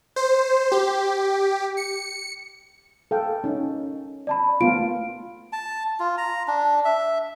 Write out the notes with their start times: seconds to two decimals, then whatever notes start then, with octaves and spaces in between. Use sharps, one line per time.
0.16 C5
0.72 G4
1.77 C#7
3.11 A4 F5 G5
3.44 C#4 D#4
4.27 D5 A5 B5
4.61 A3 B3 F4 D7
5.53 A5
6.00 F4
6.18 A#5
6.48 D4
6.85 E5